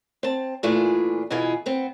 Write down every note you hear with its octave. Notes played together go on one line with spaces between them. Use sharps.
C4 A5
A#2 E3 A3 D4 F4 G#4
B2 E3 E4 F4 G#4
B3 C4